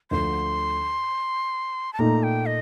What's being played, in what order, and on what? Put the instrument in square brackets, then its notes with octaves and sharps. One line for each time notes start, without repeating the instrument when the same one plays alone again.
[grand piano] D2 D3 F3 [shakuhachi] C6
[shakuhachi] A5
[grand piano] A#2 A3 D#4 [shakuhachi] A#5
[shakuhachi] G5
D#5